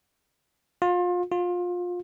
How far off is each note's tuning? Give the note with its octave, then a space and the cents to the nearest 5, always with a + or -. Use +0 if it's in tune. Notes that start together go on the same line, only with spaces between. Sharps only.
F4 +30
F4 +25